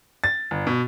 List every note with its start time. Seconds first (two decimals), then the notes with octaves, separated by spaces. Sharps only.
0.24 A6
0.51 G1
0.67 B2